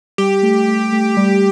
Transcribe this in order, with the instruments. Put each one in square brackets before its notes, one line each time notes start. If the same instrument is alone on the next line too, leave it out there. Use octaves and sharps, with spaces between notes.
[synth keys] G3 [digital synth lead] G4
[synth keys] A3
A3
A3
G3